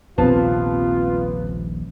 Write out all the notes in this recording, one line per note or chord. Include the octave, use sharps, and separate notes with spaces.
D#1 A#1 C3 F3 B3 F4 A5